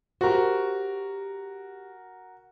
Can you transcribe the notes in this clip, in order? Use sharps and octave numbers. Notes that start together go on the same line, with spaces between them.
F#4 G4 A#4 C5